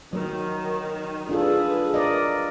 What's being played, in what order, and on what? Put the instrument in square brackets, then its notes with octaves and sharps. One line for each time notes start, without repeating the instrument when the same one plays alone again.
[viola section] D#3 [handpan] F#3
[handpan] D4 F4 A4 [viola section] G#4 B4
[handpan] A#4 D5 D#5